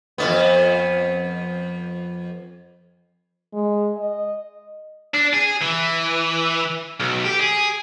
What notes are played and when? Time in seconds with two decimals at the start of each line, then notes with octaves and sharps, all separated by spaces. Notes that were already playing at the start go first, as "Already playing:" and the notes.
0.18 F2 A2 B3
3.53 G#3
3.97 D#5
5.14 D4
5.34 G#4
5.62 E3
7.00 B1
7.25 G4
7.41 G#4